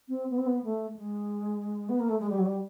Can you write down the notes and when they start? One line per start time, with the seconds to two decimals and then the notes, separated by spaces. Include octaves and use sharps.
0.09 C4
0.30 B3
0.38 C4
0.46 B3
0.63 A3
0.96 G#3
1.89 B3
2.00 A#3
2.09 A3
2.19 G#3
2.29 G3
2.38 F#3
2.45 G3